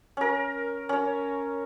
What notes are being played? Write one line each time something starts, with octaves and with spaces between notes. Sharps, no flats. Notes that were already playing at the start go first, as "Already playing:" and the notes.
C#4 A#4
C#4 C#5